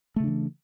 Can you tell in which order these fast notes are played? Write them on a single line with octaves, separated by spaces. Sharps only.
A3 C#3 D4 E3